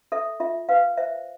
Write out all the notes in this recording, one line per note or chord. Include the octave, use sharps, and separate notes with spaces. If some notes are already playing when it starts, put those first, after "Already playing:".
A4 E5
F4 E5
B4 F5
C5 E5